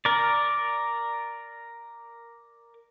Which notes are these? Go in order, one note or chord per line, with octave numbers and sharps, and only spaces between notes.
A#4 D5